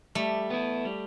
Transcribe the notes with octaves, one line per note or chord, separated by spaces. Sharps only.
G3 A3
B3 E4
G3